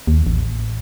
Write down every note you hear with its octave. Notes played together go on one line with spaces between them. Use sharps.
D#2
A1